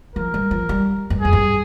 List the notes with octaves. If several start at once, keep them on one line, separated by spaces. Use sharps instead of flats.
F3 A#4
G3
F3
G3
G2
F2 G#4
G2